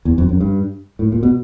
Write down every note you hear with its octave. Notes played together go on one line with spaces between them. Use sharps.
E2
F2
F#2
G2
A2
A#2
B2